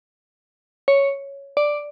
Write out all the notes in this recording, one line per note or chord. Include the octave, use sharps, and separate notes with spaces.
C#5
D5